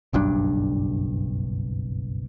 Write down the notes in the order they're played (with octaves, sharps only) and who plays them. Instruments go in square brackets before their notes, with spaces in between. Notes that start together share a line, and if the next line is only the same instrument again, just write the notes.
[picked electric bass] F#1 B1 G2 D4